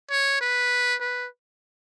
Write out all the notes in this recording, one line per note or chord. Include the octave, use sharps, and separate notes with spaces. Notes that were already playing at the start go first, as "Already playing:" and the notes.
C#5
B4
B4